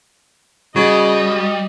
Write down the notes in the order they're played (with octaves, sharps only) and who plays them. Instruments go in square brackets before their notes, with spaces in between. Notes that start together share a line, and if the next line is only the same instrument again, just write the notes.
[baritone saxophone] C#3 [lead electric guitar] G3 [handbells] F#4 [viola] D#5